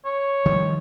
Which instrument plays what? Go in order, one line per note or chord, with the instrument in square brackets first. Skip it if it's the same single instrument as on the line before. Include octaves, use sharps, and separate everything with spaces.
[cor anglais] C#5
[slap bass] D#3 F3 G3